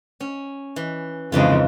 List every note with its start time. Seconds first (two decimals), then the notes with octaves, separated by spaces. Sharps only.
0.20 C#4
0.76 E3
1.32 F2 G#2 C#3 E3 G#3 F4